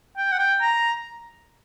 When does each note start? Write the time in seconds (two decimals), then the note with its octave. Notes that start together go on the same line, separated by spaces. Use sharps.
0.17 G5
0.32 F#5
0.39 G5
0.61 A#5